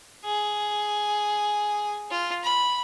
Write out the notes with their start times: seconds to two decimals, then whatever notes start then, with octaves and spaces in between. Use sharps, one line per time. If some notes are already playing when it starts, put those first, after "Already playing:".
0.24 G#4
2.11 F4
2.43 B5